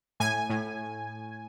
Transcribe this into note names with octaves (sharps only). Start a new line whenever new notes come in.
A2 G#5
A2